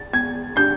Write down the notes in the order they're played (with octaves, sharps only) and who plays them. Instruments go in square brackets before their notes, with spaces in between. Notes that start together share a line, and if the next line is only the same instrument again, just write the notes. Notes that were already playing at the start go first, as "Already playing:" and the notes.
Already playing: [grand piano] A6
[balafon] B3 [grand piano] G#6
[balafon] D4 G4 [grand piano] G6